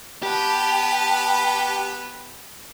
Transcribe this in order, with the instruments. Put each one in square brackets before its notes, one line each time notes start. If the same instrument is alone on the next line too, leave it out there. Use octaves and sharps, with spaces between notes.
[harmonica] B3 B4 [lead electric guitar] G4 [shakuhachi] A5